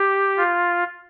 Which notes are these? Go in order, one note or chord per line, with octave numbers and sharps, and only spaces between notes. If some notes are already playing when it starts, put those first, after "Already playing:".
Already playing: G4
F4